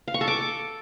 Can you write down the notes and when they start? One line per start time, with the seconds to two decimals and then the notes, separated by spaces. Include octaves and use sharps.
0.08 F5
0.14 C#6
0.21 A4
0.28 D6